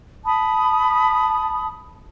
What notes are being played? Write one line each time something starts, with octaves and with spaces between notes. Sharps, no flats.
A5 B5 D#6